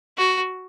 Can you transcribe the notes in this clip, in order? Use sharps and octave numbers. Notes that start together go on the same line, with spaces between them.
F#4